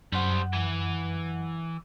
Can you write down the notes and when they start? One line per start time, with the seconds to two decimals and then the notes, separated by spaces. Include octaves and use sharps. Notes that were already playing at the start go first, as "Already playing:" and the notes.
0.12 F#2 G3 C5 F#5
0.53 E3